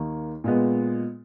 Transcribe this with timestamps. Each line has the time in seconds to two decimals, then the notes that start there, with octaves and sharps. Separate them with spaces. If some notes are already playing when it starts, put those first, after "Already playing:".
Already playing: D#2 D#3 A#3
0.44 A#2 G#3 B3